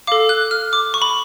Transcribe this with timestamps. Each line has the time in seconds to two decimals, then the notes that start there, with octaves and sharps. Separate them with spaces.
0.07 A4 F5 D6
0.29 F#6
0.51 F6
0.73 D6
0.94 C#6
1.02 B5